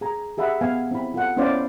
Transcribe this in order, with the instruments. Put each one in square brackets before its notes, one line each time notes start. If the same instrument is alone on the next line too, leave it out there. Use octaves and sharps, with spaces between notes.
[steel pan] G#4 G#5 A#5
G4 G#4 E5 F#5 B5
B3 F5 G#5
C4 E4 B5
F4 A4 F#5
B3 C#4 E4 C5 D5 F5